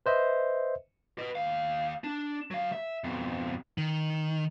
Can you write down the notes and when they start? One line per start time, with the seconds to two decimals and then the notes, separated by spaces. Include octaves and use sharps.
0.06 B4 C5 D#5 E5
1.18 B4 D#5
1.35 D#2 F5
2.04 D4
2.51 F#3 F5
2.72 E5
3.04 F2 B2
3.78 D#3